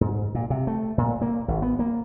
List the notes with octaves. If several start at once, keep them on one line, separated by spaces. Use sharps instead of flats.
G#2
A#2
C3
A3
A#2
A#3
G#1
B3
A#3